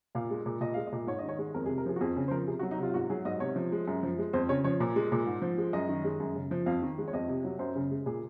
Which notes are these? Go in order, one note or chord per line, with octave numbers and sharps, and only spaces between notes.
A#2 F5
G#3
A#2
A#2 D#5
G#3 F5
D#5
A#2
G#2 C#5
D#3 D#5
C#5
G#3
F2 A#4
G#4
C3
A#4
F3 G#4
F#4
F2 G#4
C#3 G#4
C5
F3 A#4
C3 G#4
F#4
F#3
D#4
C3 F4
F4
G#2 F#4
F#3 G#4
G#2 D#5
C3 C#5
F3
G#3
F#2
F3
G#3
F2 C5
C#3 C#5
F3 C#5
A#2
G#3
A#2
G#2
F3
G#3
F#2 D#5
D#3
G#3
F#2
C#3
F3
F2 F5
D#3
G#3
C#5
F2 D#5
C3
F#3
F#2 C5
C#3
G#3
A#2 G#4